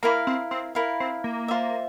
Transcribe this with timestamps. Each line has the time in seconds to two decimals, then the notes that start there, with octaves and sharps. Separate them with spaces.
0.02 A#3 E4 A#4 F5
0.27 C4
0.51 C4
0.75 E4 A#4 F5
1.00 C4
1.24 A#3
1.48 F4 C5 E5